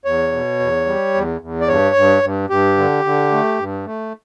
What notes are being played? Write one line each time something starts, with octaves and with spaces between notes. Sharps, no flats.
E2 C#5
B2
E2
G3
E2
E2
D5
G2 C#5
G2
G2
G2 G4
D3
D3
A3
G2
A3